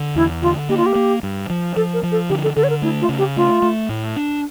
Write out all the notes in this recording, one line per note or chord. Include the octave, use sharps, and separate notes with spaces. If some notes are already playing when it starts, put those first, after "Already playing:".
Already playing: D3
E2 E4
D3 F4
A#3 G4
F4
G4
A#3
G2
F3
F3 A4
A#4
F3
A4
D3 G4
A4
D3 A4
C#5
A#4
A3 E4
F4
C#3
G4
A3 F4
A3
A2
D4